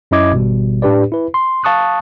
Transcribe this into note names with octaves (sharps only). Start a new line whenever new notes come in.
F#2 C#4 E4 D#5 D6 G#6
G#1 B2 G3
A2 D4 G4 B4 D5
E4 B4
C6
F5 A5 C#6 D#6 F#6